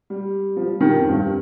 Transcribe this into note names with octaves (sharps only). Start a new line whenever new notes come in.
G3
F3
G3
D#3
F2
G2